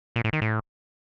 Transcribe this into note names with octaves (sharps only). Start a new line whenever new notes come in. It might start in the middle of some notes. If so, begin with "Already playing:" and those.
A#2
A2
D#3
A2